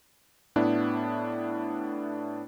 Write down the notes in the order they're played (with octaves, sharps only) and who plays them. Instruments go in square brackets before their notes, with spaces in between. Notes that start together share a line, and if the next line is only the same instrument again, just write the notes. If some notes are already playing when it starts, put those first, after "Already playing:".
[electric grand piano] A2 B3 D4 E4